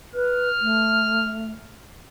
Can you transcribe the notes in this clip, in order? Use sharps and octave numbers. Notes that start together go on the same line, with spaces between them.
B4 F6
A3